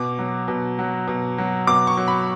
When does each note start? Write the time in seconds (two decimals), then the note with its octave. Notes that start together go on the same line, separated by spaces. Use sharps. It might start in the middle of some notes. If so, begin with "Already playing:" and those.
Already playing: B2 D6
0.19 F#3
0.48 B2
0.79 F#3
1.08 B2
1.38 F#3
1.67 B2 D6
1.87 C#6
1.97 F#3
2.08 B5